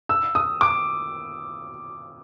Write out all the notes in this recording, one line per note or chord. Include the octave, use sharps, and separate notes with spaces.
E6
D#6
D6